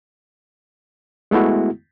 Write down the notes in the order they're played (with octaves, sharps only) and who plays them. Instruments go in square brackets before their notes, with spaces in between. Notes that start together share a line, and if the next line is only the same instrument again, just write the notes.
[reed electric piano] G#3 A3 B3 E4 F#4